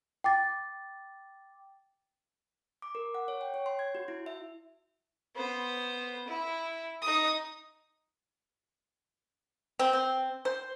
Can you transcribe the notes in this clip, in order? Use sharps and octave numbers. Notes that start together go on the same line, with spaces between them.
G5 D6 A6
D6
A#4
F#5
C#5
G5
C#5
C6
G#6
F#4
E4
E5
B3 C5
E4
D#4 D#6
C4
C4
C5